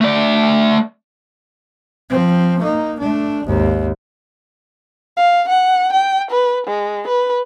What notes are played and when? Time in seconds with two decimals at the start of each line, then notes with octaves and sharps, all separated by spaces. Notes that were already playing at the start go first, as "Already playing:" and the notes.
0.01 A3 D5
2.10 F3 C4
2.60 A#3 D#4
2.99 A3 D4
3.45 G#1 D#2
5.17 F5
5.49 F#5
5.92 G5
6.31 B4
6.67 G#3
7.08 B4